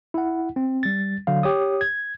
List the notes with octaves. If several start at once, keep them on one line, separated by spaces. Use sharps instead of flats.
E4 F#5
C4
G3 A6
D3 F#3 F5
G4 C#5 D#6
G#6